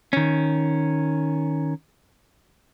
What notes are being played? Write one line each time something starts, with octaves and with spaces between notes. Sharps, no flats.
D#3 C#4